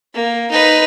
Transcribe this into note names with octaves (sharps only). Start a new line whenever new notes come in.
A#3
D#4 B4